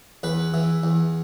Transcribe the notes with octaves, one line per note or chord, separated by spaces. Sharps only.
E2 B4
E3
E2